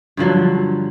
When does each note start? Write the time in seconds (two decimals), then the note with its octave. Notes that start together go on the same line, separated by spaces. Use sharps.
0.17 G2 D3 F3 F#3